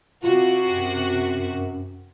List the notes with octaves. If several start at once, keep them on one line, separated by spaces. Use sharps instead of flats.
C3 F4 F#4
F#2